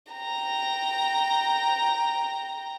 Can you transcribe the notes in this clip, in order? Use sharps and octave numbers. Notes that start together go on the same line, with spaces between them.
G5 A#5